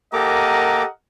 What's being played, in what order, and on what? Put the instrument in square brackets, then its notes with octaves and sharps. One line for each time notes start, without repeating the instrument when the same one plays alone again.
[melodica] A#3 A#5 D6 [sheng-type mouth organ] G4 A4 [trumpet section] A#4 D#5 F#5